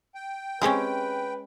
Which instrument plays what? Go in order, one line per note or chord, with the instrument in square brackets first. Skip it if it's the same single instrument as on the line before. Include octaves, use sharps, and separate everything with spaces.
[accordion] G5
[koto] G#3 C#4 [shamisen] C4 G4 G#4 [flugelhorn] B4